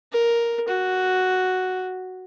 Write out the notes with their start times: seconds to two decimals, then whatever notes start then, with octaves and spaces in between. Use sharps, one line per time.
0.12 A#4
0.68 F#4